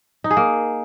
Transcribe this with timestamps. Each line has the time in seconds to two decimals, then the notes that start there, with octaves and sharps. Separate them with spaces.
0.24 D#4
0.31 G#4
0.37 A#3